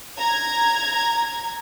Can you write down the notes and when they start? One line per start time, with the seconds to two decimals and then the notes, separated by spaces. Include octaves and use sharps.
0.19 A#5 G#6